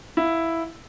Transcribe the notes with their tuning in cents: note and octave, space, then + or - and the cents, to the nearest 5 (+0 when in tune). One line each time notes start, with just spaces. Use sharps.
E4 +0 F5 +15